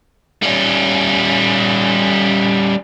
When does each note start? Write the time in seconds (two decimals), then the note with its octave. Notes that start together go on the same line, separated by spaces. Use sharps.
0.42 G3 C#4